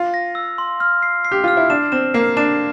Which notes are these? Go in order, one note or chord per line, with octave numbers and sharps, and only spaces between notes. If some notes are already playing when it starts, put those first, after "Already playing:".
Already playing: F4
A#6
E6
C6
F6
C7
C7
G4
F4 F6
E4
D4 E7
C4 E7
A#3 C7
D4 E7